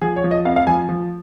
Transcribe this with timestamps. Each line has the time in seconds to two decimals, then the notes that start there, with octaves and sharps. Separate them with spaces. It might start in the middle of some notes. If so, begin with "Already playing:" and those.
0.01 F3 G#4
0.16 C#5
0.24 F3
0.31 D#5
0.45 F2 F5
0.56 F5
0.67 F3 G#5
0.89 F3